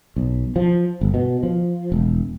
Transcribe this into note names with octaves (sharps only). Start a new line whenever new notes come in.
B1
F3
G1
B2
F3
E1